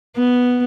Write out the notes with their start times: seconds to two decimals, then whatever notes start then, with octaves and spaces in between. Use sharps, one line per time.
0.17 B3